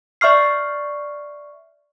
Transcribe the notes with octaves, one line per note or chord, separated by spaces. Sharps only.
D5 E5 C#6 F6 C7